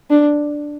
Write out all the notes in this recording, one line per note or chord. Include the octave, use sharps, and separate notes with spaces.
D4